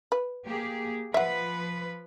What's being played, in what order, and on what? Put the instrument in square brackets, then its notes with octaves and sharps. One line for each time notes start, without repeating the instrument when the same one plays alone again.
[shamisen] B4
[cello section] A#3 G4 G#4
[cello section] F3 B4 [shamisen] E5 F#5